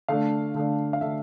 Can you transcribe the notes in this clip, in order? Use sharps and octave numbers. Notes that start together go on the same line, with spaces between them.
D3 A3 D4 F5
D3 A3 D4
F5
D3 A3 D4 E5